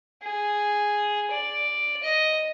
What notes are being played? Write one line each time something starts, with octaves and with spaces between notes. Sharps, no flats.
G#4
D5
D#5